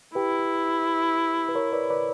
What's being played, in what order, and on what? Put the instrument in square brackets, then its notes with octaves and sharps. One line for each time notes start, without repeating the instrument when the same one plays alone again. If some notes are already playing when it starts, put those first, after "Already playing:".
[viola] E4 [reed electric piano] G4 B4
[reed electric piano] B4
A#4 C#5
B4 D5
B4 D5